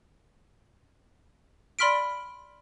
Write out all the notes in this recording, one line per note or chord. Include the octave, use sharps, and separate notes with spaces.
D5 B5 C6 F6 B6 D7